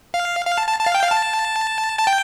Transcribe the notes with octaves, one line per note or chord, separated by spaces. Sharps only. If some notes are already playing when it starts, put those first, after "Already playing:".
F5
F5
A5
A5
A5
F5
G5
F5
A5
A5
G5